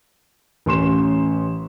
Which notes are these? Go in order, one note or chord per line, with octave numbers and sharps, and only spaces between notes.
A1 C#4 C6 E7